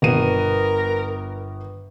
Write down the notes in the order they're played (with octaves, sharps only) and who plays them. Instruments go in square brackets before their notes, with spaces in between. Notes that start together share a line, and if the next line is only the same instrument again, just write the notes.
[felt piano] G1 B3 D#7 [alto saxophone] A#4